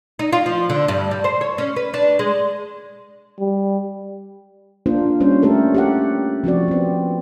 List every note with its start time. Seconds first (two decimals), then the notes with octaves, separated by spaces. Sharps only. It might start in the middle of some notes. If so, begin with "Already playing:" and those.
0.19 D#4
0.32 F4
0.46 F3
0.70 D3
0.88 G2
1.11 G3
1.24 C5
1.41 C#5
1.58 C#4
1.76 B4
1.94 D4
2.19 G#3
3.40 G3
4.86 A#3 D4 F4 C5
5.20 G3 C#4 C5
5.42 A3 G4 A4 A#4
5.74 G4 A4 F#5
6.44 F3 C4 F#4 D5
6.68 B3 C4